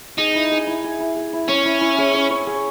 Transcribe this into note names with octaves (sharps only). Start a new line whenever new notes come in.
D#4 G#4
E4
G#4
E4
G#4
E4
G#4
E4
C#4 C#5
E4
E4
G#4
C#5
C#5
G#4